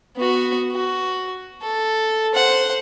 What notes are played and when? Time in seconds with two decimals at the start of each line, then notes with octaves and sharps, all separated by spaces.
0.16 B3 F#4
0.72 F#4
1.62 A4
2.35 C5 F#5